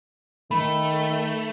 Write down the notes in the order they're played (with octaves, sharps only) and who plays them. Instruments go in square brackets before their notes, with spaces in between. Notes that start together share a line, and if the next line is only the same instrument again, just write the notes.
[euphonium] D#3 [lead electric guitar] A3 [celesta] B5